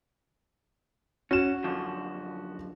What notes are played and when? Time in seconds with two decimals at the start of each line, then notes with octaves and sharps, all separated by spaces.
1.31 C#4 F#4 E7
1.64 F#2 D3 F3